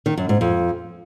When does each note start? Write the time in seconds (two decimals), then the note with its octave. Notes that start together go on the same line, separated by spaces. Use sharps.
0.06 D#3
0.17 F#2
0.29 G#2
0.41 F2